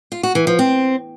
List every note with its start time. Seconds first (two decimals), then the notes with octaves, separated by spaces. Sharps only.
0.12 F4
0.23 F#4
0.35 E3
0.47 F3
0.59 C4